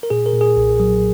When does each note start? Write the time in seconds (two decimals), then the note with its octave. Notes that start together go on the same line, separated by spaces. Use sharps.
0.03 A#4
0.10 A#2 G#4
0.26 A#4
0.33 A#2
0.41 G#4
0.57 B1
0.80 F#3